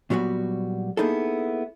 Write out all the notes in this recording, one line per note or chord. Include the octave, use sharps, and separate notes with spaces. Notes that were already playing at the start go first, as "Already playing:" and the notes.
A#2 F#3 G3 B3 F#4
A#3 B3 D#4 E4 G#4 A4